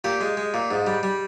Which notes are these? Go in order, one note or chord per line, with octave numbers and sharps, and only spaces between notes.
A#2 G4
G#3
G#3
A#2
G#2
G3
G3